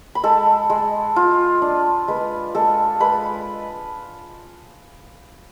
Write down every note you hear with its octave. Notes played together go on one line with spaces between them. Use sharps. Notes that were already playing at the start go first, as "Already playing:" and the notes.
B5
G#3 A4 A5
G#3
F4
D4
G#3 B4 B5
G#3 A4 A5
G#3 B4 B5